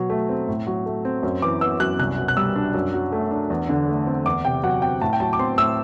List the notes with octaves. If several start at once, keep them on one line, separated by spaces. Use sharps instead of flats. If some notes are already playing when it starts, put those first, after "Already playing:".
Already playing: B2 F#3
A3
C4
A2
F#3
A3
C4
F#2
E3 D6
B3 E6
F#2 F#6
C2 F#6
B2
F#6
G3 E6
D4
F#2
F#3
A3
D4
E2
D3
A3
C4
E2 D6
C3 G5
F#3 F#5
C4 G5
A2 A5
G5
F#3 A5
D6
C4 C6
A2 E6